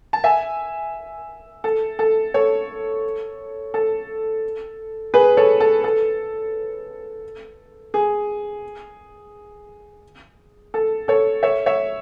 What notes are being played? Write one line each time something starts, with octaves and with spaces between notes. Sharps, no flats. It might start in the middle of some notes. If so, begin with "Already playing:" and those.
A5
E5 G#5
A4
A4
A4 C#5
A4
G#4 B4
A4 C#5
A4
A4
G#4
A4
A4 C#5
C#5 E5
C#5 E5